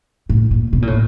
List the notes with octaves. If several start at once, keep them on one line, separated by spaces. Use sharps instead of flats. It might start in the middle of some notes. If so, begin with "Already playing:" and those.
A2
A#2
B2
A#2
A2